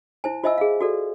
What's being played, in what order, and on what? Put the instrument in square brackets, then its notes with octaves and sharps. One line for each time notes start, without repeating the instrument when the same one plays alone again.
[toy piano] E4 C5 G#5
F4 C5 D#5 E5 G#5 E6
G#4 F5
F#4 A4 D5